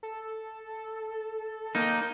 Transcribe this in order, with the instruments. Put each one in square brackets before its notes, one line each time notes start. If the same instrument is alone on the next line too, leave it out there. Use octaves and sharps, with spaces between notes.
[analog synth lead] A4
[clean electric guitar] A#3 D#4 [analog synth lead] G6